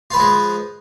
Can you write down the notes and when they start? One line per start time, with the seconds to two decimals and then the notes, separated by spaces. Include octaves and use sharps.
0.11 F4
0.13 B4
0.16 F3
0.19 G#3